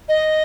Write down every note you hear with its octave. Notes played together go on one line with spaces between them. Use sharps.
D#5